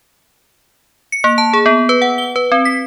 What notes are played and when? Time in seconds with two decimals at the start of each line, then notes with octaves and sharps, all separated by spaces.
1.12 C#7
1.24 A#3
1.38 A5
1.53 G#4
1.66 B3
1.89 B4
2.02 F#5
2.18 G7
2.36 B4
2.52 C4
2.65 B6